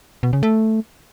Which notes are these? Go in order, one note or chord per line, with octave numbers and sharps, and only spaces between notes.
B2
C#3
A3